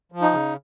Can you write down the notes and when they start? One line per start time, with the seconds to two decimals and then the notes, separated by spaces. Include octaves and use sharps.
0.12 F3
0.22 D#4
0.32 C#3